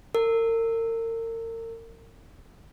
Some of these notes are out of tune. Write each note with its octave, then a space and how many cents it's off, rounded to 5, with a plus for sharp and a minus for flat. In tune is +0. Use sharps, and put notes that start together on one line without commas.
A#4 -35